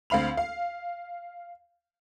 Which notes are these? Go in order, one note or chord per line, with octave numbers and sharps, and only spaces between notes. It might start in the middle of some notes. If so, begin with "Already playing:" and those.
D2 C4 F5 B5 F7
F5